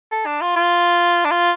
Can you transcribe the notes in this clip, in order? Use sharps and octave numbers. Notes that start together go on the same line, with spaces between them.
A4
D4
F4
F4
D4
F4